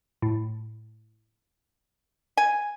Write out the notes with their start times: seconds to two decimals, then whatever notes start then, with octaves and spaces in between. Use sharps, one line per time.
0.22 A2
2.37 G#5